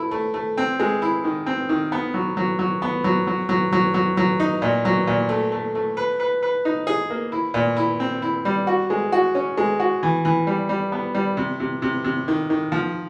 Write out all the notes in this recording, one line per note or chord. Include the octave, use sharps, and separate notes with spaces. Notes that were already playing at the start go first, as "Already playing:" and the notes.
Already playing: A3 E4
A3
A3
C4
G#3
E4
D#3
C4
D#3
B3
F#3
F#3
F#3
B3
F#3
F#3
F#3
F#3
F#3
F#3
D#4
A#2
F#3
A#2
A3
A3
A3
B4
B4
B4
D#4
G#4
A#3
E4
A#2
E4
C4
E4
G3
F#4
G#3
F#4
C#4
G#3
F#4
E3
E3
G3
G3
B3
G3
C3
C3
C3
C3
D#3
D#3
F3